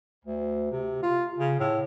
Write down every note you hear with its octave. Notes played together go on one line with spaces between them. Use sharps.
D2
C3
F4
C#3
A2